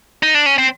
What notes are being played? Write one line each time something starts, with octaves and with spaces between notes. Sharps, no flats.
D#4
D4
C#4
C4